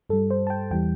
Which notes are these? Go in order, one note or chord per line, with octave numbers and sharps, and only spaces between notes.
G2 G3 A4
C5
A5
G5
E2 E3 G3 G5